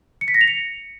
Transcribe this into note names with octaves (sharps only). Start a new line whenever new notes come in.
C#7
B6
A#6
F7
C#7